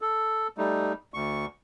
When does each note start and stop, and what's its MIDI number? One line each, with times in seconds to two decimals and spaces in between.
0.01 0.48 69
0.58 0.93 55
0.58 0.93 57
0.58 0.93 63
1.14 1.46 38
1.14 1.46 85